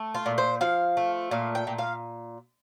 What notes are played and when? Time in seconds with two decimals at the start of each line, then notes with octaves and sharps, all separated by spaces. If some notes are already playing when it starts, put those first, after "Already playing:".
Already playing: A3
0.15 F4
0.26 A#2
0.38 C5
0.61 F3 F5
0.97 A3
1.31 A#2 F5
1.55 G5
1.67 A#2
1.78 F5